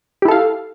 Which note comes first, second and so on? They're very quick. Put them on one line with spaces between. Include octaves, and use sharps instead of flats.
G4 E4 A4 F5